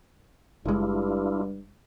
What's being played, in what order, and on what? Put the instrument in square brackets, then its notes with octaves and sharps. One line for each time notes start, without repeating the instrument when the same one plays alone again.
[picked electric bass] F#1 G#3 [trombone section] G2 [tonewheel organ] D4 E4 F4